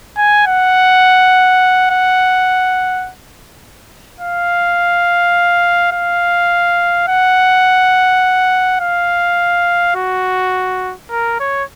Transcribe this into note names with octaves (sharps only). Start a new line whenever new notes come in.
G#5
F#5
F#5
F5
F5
F#5
F5
F#4
A#4
C#5